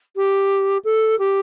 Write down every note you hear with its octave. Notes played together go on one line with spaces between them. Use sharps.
G4
A4
G4